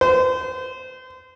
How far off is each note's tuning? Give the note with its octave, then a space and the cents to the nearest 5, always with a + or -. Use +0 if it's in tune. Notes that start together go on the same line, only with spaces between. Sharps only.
C5 -35